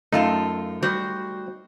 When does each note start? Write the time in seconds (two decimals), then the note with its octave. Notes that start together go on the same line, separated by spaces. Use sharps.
0.12 F#2 A3 D#4 F4 A5
0.82 G3 F#4 C5